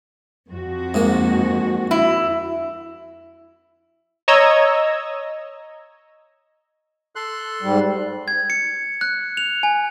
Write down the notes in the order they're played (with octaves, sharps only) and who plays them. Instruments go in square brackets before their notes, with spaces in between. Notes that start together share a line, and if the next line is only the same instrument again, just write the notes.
[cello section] F2 F#4
[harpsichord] G#2 A#3
[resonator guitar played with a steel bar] E4
[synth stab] C#5 D#5 A#5 E6 G#6
[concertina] A4 C6 F#6
[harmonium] G#2 G3
[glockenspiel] G#6
C#7
F#6
F7
G#5